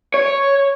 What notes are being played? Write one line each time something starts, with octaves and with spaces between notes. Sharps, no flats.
C#5